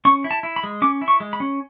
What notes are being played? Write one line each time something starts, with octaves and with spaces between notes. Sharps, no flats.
C#4 C#6
E4
A5
E4
B5
G#3
C#4 D6
E4
C#6
G#3
B5
C#4